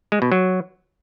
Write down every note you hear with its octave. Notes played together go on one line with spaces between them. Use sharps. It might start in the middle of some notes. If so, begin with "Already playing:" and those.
G#3
B2
F#3